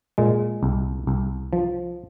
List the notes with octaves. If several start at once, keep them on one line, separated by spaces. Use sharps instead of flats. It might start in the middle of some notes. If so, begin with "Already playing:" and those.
A#2 G#3
C2
C2
F3